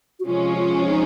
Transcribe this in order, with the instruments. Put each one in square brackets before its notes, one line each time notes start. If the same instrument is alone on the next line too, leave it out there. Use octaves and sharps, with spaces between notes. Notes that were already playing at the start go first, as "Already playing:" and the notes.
[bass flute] F#4
[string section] C3 F3 G#3 C#4 [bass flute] F4
[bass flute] F4
D#4